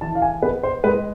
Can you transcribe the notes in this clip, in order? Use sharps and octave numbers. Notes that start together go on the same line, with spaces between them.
E3 A5
F5
G#5
B3 B4
C5
G#3 B4